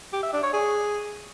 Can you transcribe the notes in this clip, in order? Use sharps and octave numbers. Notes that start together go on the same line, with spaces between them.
G4
E5
D4
C#5
G#4